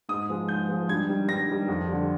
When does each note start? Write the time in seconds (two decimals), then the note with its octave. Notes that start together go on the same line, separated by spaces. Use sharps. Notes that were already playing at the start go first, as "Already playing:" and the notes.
0.09 G#2 D#6
0.29 F3 G#3
0.49 G#2 G6
0.69 F3 G#3
0.89 G2 G#6
1.08 D#3 G3
1.28 G2 A#6
1.48 D#3 G3
1.68 F2
1.88 D3 G3